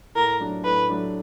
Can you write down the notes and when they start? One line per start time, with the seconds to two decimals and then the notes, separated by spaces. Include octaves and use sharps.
0.15 A2 A#4
0.40 F#3 A3 D4
0.65 A2 B4
0.89 F#3 A3 D4